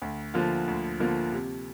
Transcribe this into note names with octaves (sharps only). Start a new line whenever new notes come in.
D2
D3 F3 A#3 F4
D2
D3 F3 A#3 F4
C3